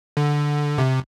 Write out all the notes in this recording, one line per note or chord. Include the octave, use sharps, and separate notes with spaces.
D3
C3